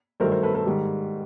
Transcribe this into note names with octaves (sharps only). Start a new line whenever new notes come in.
G2 D#3 F#3 A3 A#4 C5
A#4 C5
A4 B4
A4 B4
G#2 D#3 G3